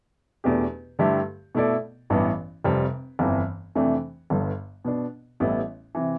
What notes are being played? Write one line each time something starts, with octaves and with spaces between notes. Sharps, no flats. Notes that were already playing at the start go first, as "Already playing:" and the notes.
E2 B2 A3 D4 G4
G2 D3 A3 E4 G4
B2 A3 E4 A4 D5
A1 G2 E3 B3
F1 F2 C3 G3 C4
G1 F2 E3
F2 C3 E3 A3 D4
G1 G2 D3
B2 B3 D4
A1 A2 G3 B3 E4
C3 E3